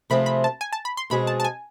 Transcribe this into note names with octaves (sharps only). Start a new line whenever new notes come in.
C3 F3 A3 C4 G#4 B5
B5
A5
G#5
A5
B5
C6
B2 G#3 C4 G#4 B5
A5
A5
G#5